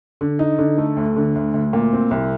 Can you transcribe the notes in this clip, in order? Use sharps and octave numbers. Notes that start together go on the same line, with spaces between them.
D3
D#4
D3
A3
D2
D3
D2
D2
A#2
C4
C2